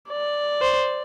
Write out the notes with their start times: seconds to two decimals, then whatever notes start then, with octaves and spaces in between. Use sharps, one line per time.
0.09 D5
0.61 C5